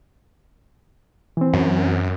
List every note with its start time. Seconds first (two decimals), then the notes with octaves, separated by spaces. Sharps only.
1.37 E3 C4
1.53 F#2